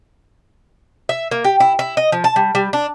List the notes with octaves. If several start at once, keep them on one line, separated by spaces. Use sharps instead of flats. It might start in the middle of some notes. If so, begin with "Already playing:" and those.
E5
A#3
G4
E4
E4
D#5
F3
A5
G3
G3
D4